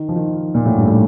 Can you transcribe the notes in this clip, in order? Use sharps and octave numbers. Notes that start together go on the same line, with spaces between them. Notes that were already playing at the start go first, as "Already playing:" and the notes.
Already playing: D#3
F3
D#3
A#2
A2
G2
A2